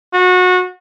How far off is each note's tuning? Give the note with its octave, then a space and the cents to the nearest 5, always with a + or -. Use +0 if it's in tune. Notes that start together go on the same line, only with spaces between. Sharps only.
F#4 -25